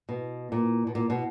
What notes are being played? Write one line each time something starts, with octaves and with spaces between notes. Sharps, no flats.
B2
A#2
B2
A#2
B2